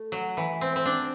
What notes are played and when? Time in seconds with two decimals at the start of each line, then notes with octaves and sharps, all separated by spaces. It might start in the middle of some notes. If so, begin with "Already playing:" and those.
Already playing: A3
0.12 F#3
0.37 E3
0.61 C4
0.76 C4
0.86 D4